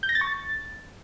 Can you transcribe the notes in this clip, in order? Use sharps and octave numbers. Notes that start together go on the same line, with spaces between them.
G6
A#6
A6
C#6
A6